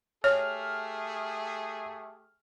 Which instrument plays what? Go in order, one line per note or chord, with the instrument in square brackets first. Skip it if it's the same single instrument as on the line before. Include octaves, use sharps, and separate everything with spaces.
[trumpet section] A3 G4 G#4 [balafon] C#5 [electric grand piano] F6